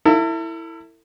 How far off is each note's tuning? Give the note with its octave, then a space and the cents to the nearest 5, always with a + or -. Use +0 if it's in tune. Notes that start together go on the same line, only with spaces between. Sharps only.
E4 +0 A4 +45